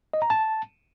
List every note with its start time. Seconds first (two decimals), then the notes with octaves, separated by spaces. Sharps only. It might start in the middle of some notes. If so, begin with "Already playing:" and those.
0.14 D#5
0.22 A#5
0.30 A5